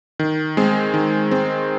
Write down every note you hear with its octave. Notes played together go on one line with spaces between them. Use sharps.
D#3
G#3 C4
D#3
G#3 C4